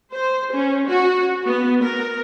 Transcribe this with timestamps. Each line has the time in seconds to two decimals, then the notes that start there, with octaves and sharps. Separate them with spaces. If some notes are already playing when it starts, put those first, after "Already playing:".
0.12 C5
0.51 C#4
0.86 F#4
1.44 B3
1.83 A#4